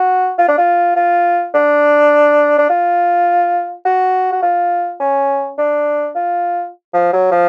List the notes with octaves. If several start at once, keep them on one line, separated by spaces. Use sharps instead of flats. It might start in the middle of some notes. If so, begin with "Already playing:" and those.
Already playing: F#4
F4
D4
F4
F4
D4
D4
F4
F#4
F#4
F4
C#4
D4
F4
F3
F#3
F3